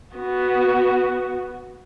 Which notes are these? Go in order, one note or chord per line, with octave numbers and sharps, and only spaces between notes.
B3 F#4